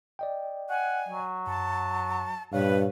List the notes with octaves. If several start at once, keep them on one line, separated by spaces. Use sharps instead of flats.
D5 D#5 G5
F#5 G#5
F#3
F#2 A5
G2 A#2 B4 C#5 F5